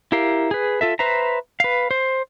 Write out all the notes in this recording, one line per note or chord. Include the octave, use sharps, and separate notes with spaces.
E4 G4 A#4 F5
G#4 B4
F4 A4 E5
B4 C5 E5 A#5
B4 F5
C5